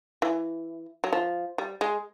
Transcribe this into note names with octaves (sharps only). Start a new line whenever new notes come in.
E3
F#3
F3
G3
G#3